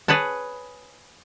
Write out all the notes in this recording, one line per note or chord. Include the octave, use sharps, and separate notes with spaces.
G#4 B4 C#5 A5